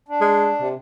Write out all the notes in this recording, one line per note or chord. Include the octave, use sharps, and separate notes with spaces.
D4
G#3
C3